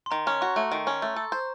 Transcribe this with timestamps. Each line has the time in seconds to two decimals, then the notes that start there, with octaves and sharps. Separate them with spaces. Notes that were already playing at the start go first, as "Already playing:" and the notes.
0.06 C6
0.11 D#3 A#5
0.27 C#4 A#5
0.41 F#4 C#6
0.56 A3
0.72 D#3
0.87 C#4
1.02 A3
1.16 A4
1.32 C5